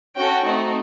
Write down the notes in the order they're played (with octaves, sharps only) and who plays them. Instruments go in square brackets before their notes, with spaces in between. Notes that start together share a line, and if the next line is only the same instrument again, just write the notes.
[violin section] C#4 F#4 A4 G5
A3 C4 D#4 F#4